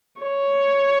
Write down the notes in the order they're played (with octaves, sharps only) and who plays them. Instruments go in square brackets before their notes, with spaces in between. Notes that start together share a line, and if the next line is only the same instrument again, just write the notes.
[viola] C#5